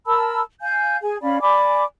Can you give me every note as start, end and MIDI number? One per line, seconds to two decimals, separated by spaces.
0.06 0.41 70
0.06 0.41 81
0.06 0.41 83
0.06 0.41 88
0.61 0.97 77
0.61 0.97 80
0.61 0.97 91
1.01 1.17 68
1.01 1.17 80
1.22 1.41 61
1.22 1.41 74
1.22 1.41 77
1.22 1.41 83
1.41 1.83 74
1.41 1.83 80
1.41 1.83 83
1.41 1.83 86